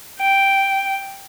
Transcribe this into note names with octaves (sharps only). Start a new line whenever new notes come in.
G5